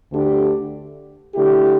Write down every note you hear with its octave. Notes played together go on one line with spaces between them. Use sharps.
D2 D3 A3 D4 G4
D3 A3 E4 G4